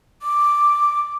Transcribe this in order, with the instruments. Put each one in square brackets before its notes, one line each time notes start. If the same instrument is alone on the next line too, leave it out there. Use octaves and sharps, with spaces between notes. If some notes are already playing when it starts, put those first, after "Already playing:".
[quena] D6